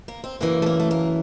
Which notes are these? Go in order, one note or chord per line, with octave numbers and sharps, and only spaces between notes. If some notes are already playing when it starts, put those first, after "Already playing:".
A#3
C4
F#2 C#3 E3 A#3
A3
A#3
A3
A#3